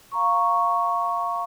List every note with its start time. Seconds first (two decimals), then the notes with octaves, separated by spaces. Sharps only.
0.12 F5 A#5 C#6